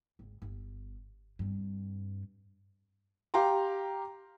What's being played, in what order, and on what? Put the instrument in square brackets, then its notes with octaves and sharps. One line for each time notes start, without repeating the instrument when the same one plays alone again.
[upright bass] G#1 D2
G1
G2 C4
[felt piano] G4 F5 G5 A#5 C6